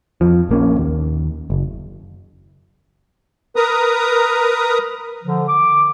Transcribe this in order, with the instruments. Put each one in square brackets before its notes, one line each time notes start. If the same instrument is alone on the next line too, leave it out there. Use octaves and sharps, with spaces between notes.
[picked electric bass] F2 F3
A#1 A#3 C#4
D#2
F#1
[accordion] A#4 B4 A#5 D#6
[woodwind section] D3 F3
D6